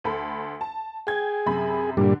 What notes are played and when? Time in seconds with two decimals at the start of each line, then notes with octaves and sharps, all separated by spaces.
0.04 D2 A4 B5
0.61 A5
1.07 G#4 G5 G#6
1.46 F#2 C3 B5
1.97 G2 A#2 D3 G3 D4